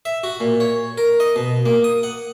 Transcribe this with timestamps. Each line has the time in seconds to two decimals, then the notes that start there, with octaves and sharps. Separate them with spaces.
0.05 E5
0.24 F#4
0.41 A#2
0.60 C#5
0.98 A#4
1.20 D#5
1.36 B2
1.66 A#3
1.84 D#6
2.03 F#5